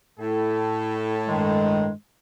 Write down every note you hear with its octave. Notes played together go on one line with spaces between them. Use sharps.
A2 A4
G2 D#3 G#3